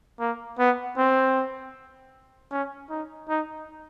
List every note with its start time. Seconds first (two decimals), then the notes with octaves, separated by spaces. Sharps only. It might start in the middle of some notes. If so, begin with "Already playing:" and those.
0.20 A#3
0.59 B3
0.97 C4
2.51 C#4
2.90 D#4
3.29 D#4